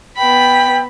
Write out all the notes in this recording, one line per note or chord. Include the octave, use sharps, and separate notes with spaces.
B3 G5 B5